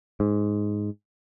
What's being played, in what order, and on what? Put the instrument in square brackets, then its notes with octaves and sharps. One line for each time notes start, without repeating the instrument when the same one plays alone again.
[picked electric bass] G#2